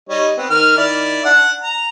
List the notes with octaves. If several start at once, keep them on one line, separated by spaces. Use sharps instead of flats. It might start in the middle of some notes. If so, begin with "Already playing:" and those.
G3 D#4 C#5
B3 C4
D#3 A#4 F6
D#3 E4 D5
D4 F#5
A#5